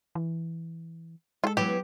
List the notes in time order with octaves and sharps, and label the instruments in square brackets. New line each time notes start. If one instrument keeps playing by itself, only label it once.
[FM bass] E3
[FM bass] G#3 [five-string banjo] F4 A4
[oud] E3 F#3 B3 [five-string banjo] G4